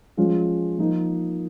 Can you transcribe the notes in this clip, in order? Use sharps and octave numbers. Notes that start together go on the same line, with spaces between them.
F3 G#3 C#4 F4
F3 A#3 D#4